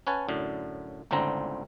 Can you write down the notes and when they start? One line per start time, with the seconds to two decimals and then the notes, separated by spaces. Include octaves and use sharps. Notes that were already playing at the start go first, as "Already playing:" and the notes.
0.07 C#4 B4 C#5 F#5 G#5 A5
0.29 F#2 A2 D3
1.11 G1 C#2 A2 D3 C4 A#5